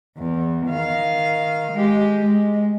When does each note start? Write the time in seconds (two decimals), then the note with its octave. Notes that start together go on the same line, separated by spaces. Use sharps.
0.17 E2
0.68 D#3 F5
1.72 G#3 G4
2.19 G#3